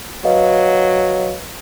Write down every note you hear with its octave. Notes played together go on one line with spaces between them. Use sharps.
F#3 B4 D#5 F5